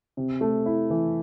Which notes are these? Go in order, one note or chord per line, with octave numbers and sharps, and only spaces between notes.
C3
A3
E4
E3